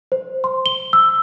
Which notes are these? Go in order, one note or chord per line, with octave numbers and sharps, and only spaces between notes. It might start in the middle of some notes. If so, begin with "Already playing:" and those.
C5
C6
G7
E6